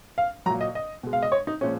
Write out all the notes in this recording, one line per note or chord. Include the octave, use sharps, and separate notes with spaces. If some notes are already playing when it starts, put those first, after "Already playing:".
F5
A#2 F#3 A#5
D#5
D#5
B2 G#3
F5
D#5
C#5
D#4
A#2 F3 G#3 C#4